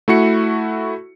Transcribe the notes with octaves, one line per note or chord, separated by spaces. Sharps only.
A3 E4 F#4 C#7